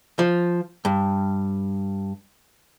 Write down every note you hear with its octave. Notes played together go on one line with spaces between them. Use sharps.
F3
G2